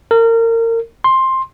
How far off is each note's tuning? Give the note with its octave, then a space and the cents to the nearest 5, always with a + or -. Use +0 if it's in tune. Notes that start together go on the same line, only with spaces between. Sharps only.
A#4 -30
C6 +10